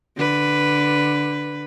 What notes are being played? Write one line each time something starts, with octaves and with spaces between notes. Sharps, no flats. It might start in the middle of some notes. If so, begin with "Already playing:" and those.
D3 B4